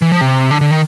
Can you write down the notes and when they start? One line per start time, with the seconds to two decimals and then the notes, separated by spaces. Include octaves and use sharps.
0.02 E3
0.12 F3
0.21 C3
0.51 D3
0.61 D3
0.71 D#3